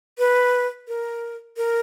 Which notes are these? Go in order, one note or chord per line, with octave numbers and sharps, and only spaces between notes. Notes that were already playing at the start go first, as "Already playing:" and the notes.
B4
A#4
A#4